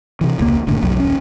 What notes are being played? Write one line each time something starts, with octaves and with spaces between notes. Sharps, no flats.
C3 E3
E1 C#2 C3 A#3
F#1 A2 D3
F1 B1 F#3
D#1 C#4